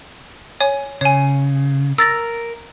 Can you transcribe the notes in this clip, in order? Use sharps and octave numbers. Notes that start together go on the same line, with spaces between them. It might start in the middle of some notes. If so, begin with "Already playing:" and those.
C#5 G#5
C#3 C#5 G#5
A#4 E6 A6 A#6